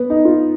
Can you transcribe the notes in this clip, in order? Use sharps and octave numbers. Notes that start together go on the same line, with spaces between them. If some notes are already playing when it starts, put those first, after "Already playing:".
Already playing: B3
D#4
F4